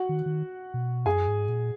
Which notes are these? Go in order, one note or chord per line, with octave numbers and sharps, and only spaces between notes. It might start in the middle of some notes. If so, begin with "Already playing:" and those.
Already playing: F#4 F#5
D#3
D#3
B2
F#2 G#4 G#5
G#2
A#2